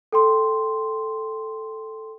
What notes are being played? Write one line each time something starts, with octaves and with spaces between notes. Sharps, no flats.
A4 G5 C6